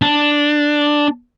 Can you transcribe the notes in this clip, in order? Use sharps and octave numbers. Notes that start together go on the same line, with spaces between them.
D4